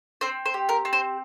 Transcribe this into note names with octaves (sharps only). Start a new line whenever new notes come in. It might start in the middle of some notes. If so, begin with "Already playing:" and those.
C4 C5
C5
G4
A#4
C4
C5